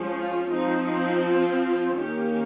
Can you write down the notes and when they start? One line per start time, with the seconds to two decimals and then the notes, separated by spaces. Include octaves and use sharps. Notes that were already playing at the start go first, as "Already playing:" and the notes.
Already playing: F3 G#3 C#4
0.16 F4
0.53 F3 C4 D#4
1.27 F4
1.64 F4
2.01 D#3 A#3 C#4 G4